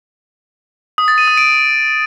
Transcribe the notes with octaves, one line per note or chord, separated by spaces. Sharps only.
D#6
A6
D#7
D#6
D7